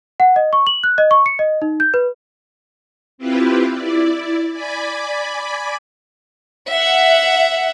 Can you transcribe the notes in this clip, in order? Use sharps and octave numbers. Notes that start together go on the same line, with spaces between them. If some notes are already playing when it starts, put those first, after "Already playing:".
F#5
D#5
C#6
F#7
F#6
D#5
C#6
C#7
D#5
D#4
G6
B4
C4 E4 F4 G4 B4
E4 D5
D5 G#5 B5 D6
E5 F#5